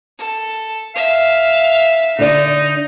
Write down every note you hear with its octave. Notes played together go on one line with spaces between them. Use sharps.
A4
E5 F5
D3 D#4 D5